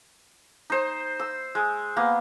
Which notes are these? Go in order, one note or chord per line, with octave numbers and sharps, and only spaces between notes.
D#4 C5
E6
G#3
A#3 B3